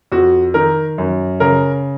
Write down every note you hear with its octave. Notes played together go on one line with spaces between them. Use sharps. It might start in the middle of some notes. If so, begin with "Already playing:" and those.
F2 F#4
D#3 A#4
F#2
C#3 A#4